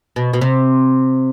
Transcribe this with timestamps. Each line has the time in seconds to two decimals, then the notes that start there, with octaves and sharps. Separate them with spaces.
0.16 B2
0.33 B2
0.41 C3